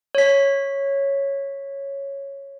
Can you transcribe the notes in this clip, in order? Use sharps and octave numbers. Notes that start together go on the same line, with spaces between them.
C#5 B6